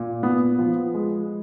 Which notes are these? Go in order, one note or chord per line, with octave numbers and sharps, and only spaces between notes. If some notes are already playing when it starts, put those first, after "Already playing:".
Already playing: A#2
B3
F3
G#3